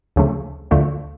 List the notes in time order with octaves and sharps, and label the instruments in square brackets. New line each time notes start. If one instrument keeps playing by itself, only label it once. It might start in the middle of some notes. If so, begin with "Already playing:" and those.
[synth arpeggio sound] D2 C#3 F3 A3
D2 D3 F3 A3